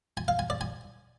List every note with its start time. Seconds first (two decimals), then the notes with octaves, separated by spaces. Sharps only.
0.17 G#5
0.28 F5
0.39 G#5
0.50 D5
0.61 G#5